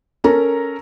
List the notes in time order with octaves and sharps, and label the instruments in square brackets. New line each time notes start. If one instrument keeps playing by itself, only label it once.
[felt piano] C#4 A4 A#4 A#5